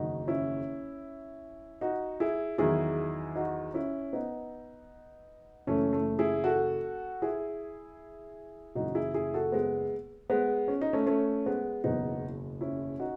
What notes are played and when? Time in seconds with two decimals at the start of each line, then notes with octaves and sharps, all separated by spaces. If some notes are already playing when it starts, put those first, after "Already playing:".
Already playing: F#1 E2 D#3 F#3 D#4 F#4
0.27 C#4 E4
1.81 D#4 F#4
2.20 E4 G#4
2.58 E2 D#3 F#3 E4 G#4
3.35 D#4 F#4
3.74 C#4 E4
4.13 B3 D#4
5.67 F#1 F#2 E3 A3 C#4
5.93 A3
6.19 E4 G#4
6.44 F#4 A4
7.22 E4 G#4
8.75 F#1 F#2 E3 D#4 F#4
8.95 E4 G#4
9.14 E4 G#4
9.34 F#4 A4
9.52 G#3 B3
10.30 G#3 B3
10.68 C#4
10.81 D#4
10.93 A3 C#4
11.07 A3 C#4
11.46 G#3 B3
11.84 F#1 E2 B2 F#3 B3 D#4
12.61 C#4 E4
13.00 D#4 F#4